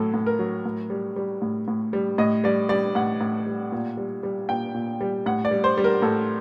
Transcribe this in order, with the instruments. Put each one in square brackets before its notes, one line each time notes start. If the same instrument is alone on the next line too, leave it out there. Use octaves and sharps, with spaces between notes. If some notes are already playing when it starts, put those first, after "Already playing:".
Already playing: [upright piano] A2 F#3 A4
A2
A#4
F#3
A2
G3
G3
A2
A2
G3
A2 D#5
G3 D5
G3 D5
A2 F#5
A2
G3
A#2
G3
G3
A#2 G5
A#2
G3
A2 F#5
D5
G3
C5
G3
A#4
A2 A4